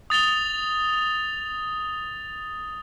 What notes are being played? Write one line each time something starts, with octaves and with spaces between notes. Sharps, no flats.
D#6 A6 F7 G7